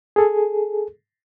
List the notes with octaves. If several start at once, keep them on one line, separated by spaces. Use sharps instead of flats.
G#4 A4